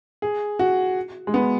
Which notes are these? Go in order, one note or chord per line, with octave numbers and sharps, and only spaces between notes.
G#4
F#4
G#3
B3